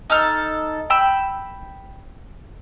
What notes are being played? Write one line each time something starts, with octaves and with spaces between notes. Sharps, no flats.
D#4 A4 F6
G5 B5 E6